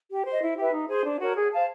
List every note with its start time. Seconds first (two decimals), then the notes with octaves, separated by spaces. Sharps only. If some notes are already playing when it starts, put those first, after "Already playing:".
0.11 G4
0.26 C5 D#5
0.41 E4
0.57 G4 B4 E5
0.73 D#4
0.89 G#4 C5
1.04 D4
1.20 F#4 A#4 C#5
1.36 G#4
1.51 C5 F5 A5